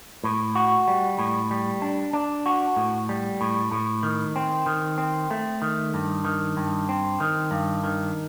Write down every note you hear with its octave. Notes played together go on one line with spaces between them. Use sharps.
A2
F#4
G3
A2
G3
D4
D4
F#4
A2
G3
A2
A2
D#3
C4
D#3
C4
A3
D#3
G2
D#3
G2
C4
D#3
G2
D#3